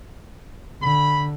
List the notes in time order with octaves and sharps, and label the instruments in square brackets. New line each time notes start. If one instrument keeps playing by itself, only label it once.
[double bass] D3 [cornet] B5